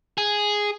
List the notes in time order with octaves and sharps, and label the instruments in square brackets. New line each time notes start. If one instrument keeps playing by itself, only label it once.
[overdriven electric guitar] G#4